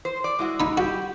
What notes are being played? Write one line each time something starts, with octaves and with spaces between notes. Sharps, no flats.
C5
D5
G#3 E4 F#4
D#4 B5
F#4 G4